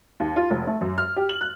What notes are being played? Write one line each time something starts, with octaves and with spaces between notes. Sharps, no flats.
D#2
F4
F1
A3
F#2
F6
G4
F#7
F#6